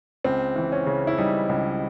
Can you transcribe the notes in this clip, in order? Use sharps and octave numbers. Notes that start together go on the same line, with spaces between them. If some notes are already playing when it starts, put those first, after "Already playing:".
C#2 C4
E3
C#4
C#3
E4
G3 D#4
C#2